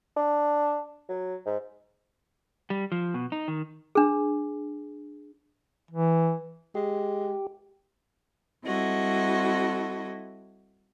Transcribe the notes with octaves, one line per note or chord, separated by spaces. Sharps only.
D4
F#3
G#2
G3
F3
B2
D#4
D#3
D4 G#4
E3
G#3 G4
G3 C4 E4 F#4 A4 D#5